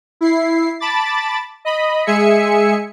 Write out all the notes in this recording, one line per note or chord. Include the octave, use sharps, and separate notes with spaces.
E4 C7
A5 B5 D6 A6
D#5 B5
G#3 G#4 E5 G#5 C#7